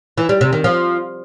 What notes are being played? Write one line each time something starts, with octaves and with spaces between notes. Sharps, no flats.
E3
G3
C3
D#3
F3